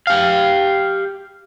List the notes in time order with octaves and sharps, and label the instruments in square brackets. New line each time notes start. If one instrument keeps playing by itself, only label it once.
[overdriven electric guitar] G4 F5